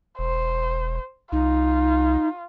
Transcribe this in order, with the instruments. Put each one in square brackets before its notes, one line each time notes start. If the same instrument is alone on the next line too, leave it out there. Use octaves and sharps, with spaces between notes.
[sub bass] E1 [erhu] C5
[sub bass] C2 [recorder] D#4 [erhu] F4